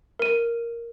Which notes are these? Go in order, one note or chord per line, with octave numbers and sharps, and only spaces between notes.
A#4 D#7